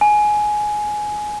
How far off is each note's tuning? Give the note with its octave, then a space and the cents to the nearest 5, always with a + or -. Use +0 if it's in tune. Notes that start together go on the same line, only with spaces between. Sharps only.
G#5 +15